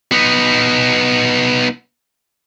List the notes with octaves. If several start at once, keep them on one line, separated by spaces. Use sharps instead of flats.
B3 D#4